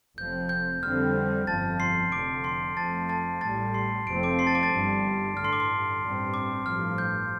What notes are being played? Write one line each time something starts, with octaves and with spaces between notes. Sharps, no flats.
F1 F2 F3 C4 G6
G6
F2 D3 G3 C4 F6
G1 F2 F3 A5 A6
C6 C7
F1 F2 D3 D6 D7
C6 C7
F2 F3 A3 A5 A6
A5 A6
A1 A2 G3 A5 A6
C6 C7
F1 F2 F3 A3 C4 D7
D6 D7
C6 C7
A5 A6
D6 D7
A5 A6
G1 G2 G3
A1 G2 D3 F6
C6 C7
D6
C6
A1 G2 G3 C4
D6
A1 G2 F3 F6
G6